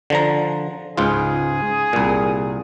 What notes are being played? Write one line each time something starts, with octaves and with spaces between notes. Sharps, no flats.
D3 F3 A#5
C#2 G#2 F4 G#4
C2 A#2